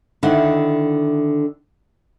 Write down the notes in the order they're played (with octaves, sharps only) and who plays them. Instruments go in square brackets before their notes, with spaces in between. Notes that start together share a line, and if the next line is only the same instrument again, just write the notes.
[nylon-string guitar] D3 D#3 E4 E5 F#5